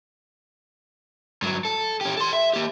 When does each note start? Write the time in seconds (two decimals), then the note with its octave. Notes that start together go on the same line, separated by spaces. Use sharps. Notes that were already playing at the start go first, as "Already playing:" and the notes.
1.42 G2 F#3
1.65 A4
2.01 C#4 G4
2.17 A4 C6
2.33 E5
2.53 A#3 G4